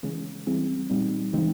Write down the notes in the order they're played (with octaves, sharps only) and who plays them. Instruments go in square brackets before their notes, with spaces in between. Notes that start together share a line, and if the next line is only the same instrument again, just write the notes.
[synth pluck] C#3 E3 G#3 C#4
E3 G3 C4 E4 G#4
A#2 G3 C4 D#4
C#3 E3 G#3 C4 D#4